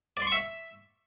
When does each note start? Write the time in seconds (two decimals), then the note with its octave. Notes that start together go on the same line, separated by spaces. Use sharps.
0.17 D5
0.22 C6
0.27 C#6
0.32 E5